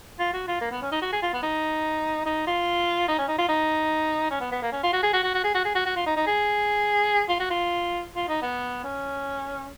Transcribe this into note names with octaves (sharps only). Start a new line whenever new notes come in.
F4
F#4
F4
A#3
B3
C#4
D#4
F#4
G#4
F4
B3
D#4
D#4
F4
D#4
C#4
D#4
F4
D#4
C#4
B3
B3
A#3
C#4
F4
F#4
G#4
F#4
F#4
F#4
G#4
F#4
G#4
F#4
F#4
F4
D#4
D#4
G#4
F4
F#4
F4
F4
D#4
B3
C#4